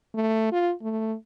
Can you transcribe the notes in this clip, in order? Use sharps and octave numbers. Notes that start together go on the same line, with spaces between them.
A3
F4
A3